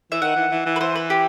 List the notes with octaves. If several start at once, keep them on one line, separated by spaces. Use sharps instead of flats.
E3 E5
D#3 F#5
E3
E3
E3
B4
E3 C5
B4
G4